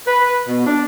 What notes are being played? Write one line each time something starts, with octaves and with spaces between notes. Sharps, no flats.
B4
B2
D4